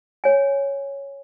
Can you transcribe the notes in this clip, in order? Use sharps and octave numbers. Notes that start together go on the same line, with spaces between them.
C#5 G#5